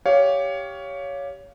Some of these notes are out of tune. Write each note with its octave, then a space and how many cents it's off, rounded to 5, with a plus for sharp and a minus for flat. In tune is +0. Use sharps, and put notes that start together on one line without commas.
G4 +0 C#5 +15 F5 +0